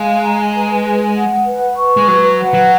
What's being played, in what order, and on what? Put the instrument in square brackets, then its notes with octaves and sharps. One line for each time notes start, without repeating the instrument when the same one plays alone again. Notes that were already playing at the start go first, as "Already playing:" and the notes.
Already playing: [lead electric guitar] G#3 [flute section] F5
[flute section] A#5
B4
G#4
F#5
B4
C#6
[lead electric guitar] G#3
[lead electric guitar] F#3 [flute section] B4
[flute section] F#5
[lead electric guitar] F#3